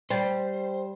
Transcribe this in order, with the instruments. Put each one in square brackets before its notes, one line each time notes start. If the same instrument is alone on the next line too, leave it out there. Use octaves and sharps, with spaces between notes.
[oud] G3 [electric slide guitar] C5